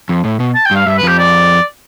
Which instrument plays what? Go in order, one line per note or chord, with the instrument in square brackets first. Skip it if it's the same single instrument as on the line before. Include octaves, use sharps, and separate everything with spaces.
[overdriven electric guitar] F2
A2
B2
[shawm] A5
G5
[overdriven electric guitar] G2 [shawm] F5
[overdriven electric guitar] G2 [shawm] E5
[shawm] B4
[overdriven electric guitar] F2 [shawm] G4
[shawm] D5